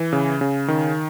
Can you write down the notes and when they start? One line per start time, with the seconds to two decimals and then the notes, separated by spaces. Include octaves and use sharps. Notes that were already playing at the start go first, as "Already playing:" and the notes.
Already playing: E3
0.13 C#3
0.41 C#3
0.68 D#3